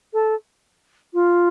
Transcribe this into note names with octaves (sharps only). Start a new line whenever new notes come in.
A4
F4